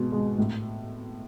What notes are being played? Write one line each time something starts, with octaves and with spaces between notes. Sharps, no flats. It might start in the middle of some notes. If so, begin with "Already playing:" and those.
Already playing: B2 G#3
G#3
A2